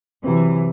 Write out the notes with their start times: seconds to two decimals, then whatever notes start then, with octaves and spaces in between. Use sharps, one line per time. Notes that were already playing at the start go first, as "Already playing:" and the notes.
0.24 C3 E3 F#3 C4